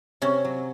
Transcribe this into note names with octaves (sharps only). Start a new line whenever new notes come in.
C3 C#4
F#3